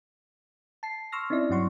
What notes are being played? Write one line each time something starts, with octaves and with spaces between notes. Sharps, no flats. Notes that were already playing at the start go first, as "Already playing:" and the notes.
A5 C7
C6 C#6 E6 F6 A#6
C4 C#4 D#4 E4 D5
G2 F#3 C#4 F#5 C6 C#6